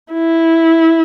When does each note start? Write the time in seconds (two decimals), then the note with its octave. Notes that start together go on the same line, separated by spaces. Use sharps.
0.13 E4